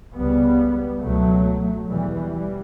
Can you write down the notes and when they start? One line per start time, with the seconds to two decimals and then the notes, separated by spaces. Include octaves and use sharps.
0.16 C#2 C#3 G3 B3
1.02 C#2 B2 F#3 A3
1.88 E2 B2 E3 G3
2.32 E3 G3